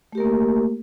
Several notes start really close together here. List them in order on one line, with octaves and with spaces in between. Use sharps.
A3 G4 A#4 A#3